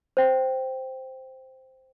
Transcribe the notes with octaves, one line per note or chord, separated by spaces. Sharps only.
C5 G5